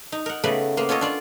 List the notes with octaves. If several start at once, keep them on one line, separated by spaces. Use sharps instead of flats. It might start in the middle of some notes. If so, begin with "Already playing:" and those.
D#4
A#4 F#5
C#3 A3 B3 B4 D5
A#3 B3 C6
C#4 F4 A4 C#5 D#5
D4 F4 D5